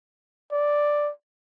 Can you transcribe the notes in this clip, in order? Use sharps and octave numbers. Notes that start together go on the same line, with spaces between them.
D5